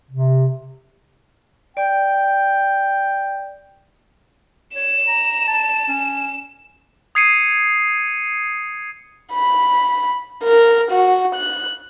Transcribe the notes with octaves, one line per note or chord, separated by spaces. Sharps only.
C3
D5 G5
C#5 E7
A#5
A5
C#4
D#6 G#6 C7 C#7 D#7
B5
A#4
F#4
F#6